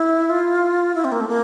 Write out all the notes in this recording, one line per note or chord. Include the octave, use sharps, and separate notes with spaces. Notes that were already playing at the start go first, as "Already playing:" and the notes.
Already playing: E4
F4
E4
C4
A#3
A3
A#3